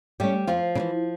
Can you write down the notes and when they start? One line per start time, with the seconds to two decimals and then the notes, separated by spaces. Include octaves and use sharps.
0.20 G3 A3 C#4 G4
0.47 F2 F3 F4
0.75 C#3
0.80 E3